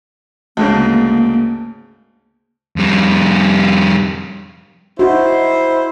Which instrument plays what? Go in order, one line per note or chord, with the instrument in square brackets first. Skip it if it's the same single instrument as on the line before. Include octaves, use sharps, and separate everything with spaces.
[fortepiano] D2 G#2 C#3 [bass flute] A#3
[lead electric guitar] F2 G3
[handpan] D#4 F#4 [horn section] E4 C5